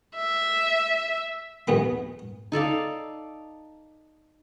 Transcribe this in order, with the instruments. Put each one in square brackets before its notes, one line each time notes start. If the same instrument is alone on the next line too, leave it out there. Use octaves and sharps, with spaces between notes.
[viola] E5
[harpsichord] A#1 D#2 B3 B5
[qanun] D#4 A4 D5 F5